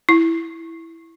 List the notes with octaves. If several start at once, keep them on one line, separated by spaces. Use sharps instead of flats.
E4